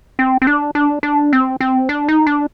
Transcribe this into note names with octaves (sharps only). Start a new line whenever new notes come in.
C4
C4
D4
D4
D4
C4
C4
D4
D#4
D4